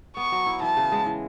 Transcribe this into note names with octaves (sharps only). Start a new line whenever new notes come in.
B3 C#6
F#3
E4
E3 A5
C#3
G#3
E3